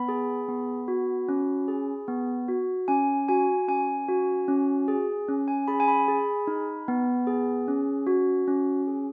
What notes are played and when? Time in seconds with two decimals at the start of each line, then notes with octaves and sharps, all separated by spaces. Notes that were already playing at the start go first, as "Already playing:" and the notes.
Already playing: B3 B5
0.08 G#4
0.49 B3
0.88 F#4
1.29 C#4
1.68 G#4
2.08 B3
2.48 F#4
2.88 C#4 G#5
3.29 F#4 G#5
3.68 C#4 G#5
4.09 F#4
4.48 C#4
4.88 G#4
5.28 C#4
5.48 G#5
5.68 G#4 B5
5.80 G#5
5.88 B5
6.08 G#4
6.47 D#4
6.88 B3
7.27 G#4
7.68 C#4
8.07 F#4
8.48 C#4
8.87 G#4